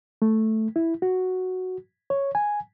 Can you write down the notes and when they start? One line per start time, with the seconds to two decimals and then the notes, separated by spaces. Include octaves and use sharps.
0.22 A3
0.76 E4
1.02 F#4
2.10 C#5
2.35 G#5